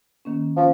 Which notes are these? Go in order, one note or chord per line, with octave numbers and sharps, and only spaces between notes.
D#3 A#3 C#4
F3 A#3 C#4 F4